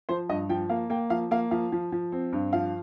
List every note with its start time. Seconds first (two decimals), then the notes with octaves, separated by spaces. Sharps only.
0.09 F3 C5
0.29 G2 D#5
0.49 F3 G5
0.69 A#3 F5
0.90 A#3 G5
1.10 F3 F5
1.31 A#3 F5
1.51 F3 F5
1.72 F3
1.92 F3
2.12 C4
2.33 G2
2.53 F3 F5